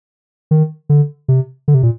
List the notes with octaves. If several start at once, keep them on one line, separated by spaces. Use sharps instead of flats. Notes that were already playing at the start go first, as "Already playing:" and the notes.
D#3
D3
C3
D3
C3
A#2